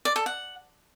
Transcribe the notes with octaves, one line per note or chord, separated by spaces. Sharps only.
D5
A4
F#5